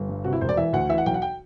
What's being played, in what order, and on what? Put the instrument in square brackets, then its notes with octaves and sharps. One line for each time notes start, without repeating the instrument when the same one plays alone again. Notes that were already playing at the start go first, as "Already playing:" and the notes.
Already playing: [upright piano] G1
G2
C3 F#4
E4
E1 C5
D5
E3 E5
D2 F#5
E3 E5
F#5
B1 G5
F#5
G5